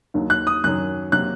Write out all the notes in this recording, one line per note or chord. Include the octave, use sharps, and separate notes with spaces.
D#2 D#3 F#3
F#6
D#6
F#2 D#3 F#3 F#6
C3 F#3 A#3 F#6